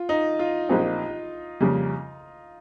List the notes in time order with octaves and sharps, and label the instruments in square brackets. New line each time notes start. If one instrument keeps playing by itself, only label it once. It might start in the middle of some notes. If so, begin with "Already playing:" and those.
Already playing: [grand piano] F4
D#4
F4
[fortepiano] A#1 A#2 F3 C4 G4 [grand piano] D#4
[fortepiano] F2 C#3 G3 A#3